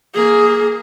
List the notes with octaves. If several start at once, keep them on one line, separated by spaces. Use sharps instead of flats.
A#3 G#4